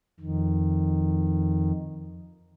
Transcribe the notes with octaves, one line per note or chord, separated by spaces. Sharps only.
F2 D#3